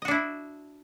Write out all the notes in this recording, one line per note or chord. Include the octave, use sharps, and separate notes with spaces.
D4 E4 F#4 D#5